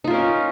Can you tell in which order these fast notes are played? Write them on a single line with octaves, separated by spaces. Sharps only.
D#4 F4 A#4 C#4